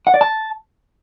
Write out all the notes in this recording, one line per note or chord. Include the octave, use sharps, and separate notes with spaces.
F#5
D5
A5